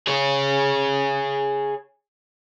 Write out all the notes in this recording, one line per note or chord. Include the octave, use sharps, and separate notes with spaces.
G#4 C#5